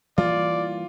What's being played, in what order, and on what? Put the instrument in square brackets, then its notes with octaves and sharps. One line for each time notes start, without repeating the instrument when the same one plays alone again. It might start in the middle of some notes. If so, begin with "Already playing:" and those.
[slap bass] E3 G3 A#3 [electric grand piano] F4 [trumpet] D5